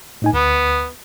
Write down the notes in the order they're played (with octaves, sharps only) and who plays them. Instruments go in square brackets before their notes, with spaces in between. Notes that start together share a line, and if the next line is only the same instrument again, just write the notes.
[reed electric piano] A2 D#4 G#5
[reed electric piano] D2 [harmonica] B3